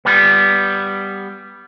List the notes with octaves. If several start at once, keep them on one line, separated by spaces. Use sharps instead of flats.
G3 B3